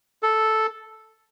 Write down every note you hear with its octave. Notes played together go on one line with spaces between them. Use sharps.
A4